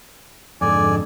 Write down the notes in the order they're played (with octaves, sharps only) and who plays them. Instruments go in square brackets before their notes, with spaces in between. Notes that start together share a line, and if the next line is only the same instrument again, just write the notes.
[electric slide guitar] F2 G#2 D3 [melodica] D5 G#5